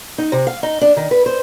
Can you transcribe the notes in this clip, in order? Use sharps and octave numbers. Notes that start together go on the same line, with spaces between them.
D#4
C3
F5
D#4
D4
D#3
B4
C5